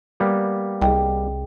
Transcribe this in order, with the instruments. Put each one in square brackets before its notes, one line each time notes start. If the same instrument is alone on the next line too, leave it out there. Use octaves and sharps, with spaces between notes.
[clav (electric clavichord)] G3 A#3 B3
[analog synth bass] C2 [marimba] G#4 D#5 G5